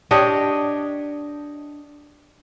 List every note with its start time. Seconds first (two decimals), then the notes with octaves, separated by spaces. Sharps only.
0.11 D4 G4 C#5 D#5